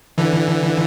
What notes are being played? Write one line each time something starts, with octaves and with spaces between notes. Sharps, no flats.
D3 E3